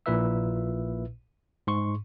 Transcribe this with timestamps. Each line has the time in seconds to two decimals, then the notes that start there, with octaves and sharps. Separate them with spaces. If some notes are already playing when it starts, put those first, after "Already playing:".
0.06 A#1 A#2 E4 B4 E5 E6
1.67 G#2 C6 C#6